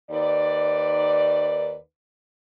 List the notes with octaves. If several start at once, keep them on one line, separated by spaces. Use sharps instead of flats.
D#2 D#3 B4 D5